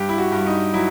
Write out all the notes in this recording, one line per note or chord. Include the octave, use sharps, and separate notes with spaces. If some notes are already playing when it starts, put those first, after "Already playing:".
Already playing: G2 G4
E4
F#4
G2
D#4
F#3 E4